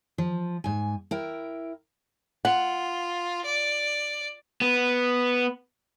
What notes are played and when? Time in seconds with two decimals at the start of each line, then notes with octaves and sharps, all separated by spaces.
0.18 F3
0.64 G#2 G#5
1.11 E4 A#4 G5
2.45 F4 F#5
3.45 D5
4.61 B3